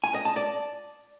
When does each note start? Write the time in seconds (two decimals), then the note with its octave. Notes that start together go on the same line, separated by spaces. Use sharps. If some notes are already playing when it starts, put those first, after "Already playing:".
0.04 G#5
0.14 D#5
0.25 A5
0.36 D5